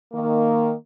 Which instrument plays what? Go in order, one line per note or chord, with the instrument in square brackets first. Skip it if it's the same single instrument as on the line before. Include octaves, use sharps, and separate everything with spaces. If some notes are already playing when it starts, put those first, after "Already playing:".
[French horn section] D#3 A#3